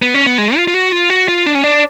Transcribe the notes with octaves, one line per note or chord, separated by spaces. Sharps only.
B3
C#4
B3
G#3
F4
F4
F#4
F4
F#4
F4
D4
C#4
D4